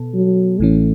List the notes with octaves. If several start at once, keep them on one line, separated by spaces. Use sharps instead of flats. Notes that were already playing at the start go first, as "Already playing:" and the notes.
Already playing: B2 B3 A4
F#3
A1 A2 E3 A3 C#4